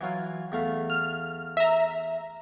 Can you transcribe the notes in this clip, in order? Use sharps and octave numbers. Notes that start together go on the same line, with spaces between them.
E3 F#3 F4
E2 A3 F5
F6
E5 A#5